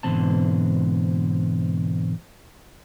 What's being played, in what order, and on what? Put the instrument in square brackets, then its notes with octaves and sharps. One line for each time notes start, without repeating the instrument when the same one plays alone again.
[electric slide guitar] G#2 B2 D3 E3 C4 A5